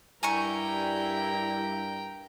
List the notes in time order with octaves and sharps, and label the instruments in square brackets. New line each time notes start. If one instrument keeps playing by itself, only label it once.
[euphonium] G2 [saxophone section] G3 E4 [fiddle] A#4 G5 [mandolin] G#5 A#5 C#6